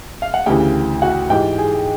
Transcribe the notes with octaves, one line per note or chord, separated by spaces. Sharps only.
F5
F#5
D2 C#3 E3 G4 G5
F#4 F#5
G#2 E3 G4 G5
G#4 G#5